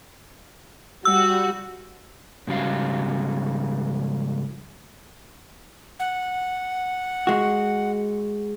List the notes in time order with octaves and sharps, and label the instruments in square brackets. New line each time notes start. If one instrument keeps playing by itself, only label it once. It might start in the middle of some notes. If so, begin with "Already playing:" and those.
[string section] G3 F#4 [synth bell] E6
[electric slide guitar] G#2 C#3 G3 F#4 F5
[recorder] F#5
[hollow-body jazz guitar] G#3 F#4